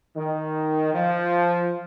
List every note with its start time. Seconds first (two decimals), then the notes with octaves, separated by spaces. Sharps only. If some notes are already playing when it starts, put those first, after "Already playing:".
0.16 D#3
0.95 F3